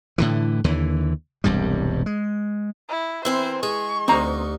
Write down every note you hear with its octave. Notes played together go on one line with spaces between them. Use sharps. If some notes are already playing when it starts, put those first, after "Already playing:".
A2 D3 E3
D#2 D3 E3
E1 C2 G2 G3
G#3
E4
E3 C4 E4 A#4 C5
G#3 G#4 C#6
D2 G2 C4 D#4 A#5